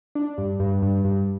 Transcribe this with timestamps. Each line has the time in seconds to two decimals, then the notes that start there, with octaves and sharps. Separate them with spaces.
0.15 D4
0.38 G2
0.60 G2
0.82 G2
1.05 G2